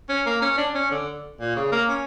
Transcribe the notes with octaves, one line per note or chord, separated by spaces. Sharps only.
C#4
A#3
C#4
D4
C#4
D3
A#2
C#3
A#3
C#4